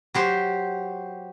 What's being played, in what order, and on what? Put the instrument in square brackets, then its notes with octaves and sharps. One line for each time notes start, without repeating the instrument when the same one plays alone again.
[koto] F#3 G4 C5